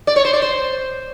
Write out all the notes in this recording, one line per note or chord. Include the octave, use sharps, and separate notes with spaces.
D5
C#5
C5
D5
C5